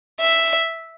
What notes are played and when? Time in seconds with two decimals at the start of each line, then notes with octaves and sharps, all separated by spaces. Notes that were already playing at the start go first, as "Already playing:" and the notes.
0.21 E5